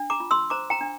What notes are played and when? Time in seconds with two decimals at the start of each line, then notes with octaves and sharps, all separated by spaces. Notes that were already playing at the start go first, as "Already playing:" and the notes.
Already playing: D4
0.10 A#5 D6
0.20 F4
0.31 C6 E6
0.50 C5 A#5 D6
0.70 G5 A#5
0.81 D4